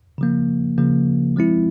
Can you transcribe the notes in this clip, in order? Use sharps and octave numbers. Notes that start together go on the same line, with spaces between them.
C#3 F3 A#3
C#3 F3 A#3
F3 G#3 C4 E4